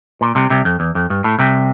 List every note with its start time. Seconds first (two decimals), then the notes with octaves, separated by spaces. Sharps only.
0.21 A#2
0.35 C2 C3
0.50 C2 C3
0.65 F2
0.80 E2
0.95 F2
1.10 G2
1.24 A2
1.39 C2 C3